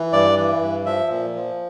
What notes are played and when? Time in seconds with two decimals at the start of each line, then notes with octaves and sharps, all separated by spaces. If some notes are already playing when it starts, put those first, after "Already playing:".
Already playing: E3
0.13 G2 D5
0.36 E3
0.61 G2
0.86 F3 E5
1.10 A#2
1.35 F3